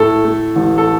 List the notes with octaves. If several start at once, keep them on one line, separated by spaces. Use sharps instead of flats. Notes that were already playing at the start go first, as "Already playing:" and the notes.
Already playing: A2 A4
A3
A1
A4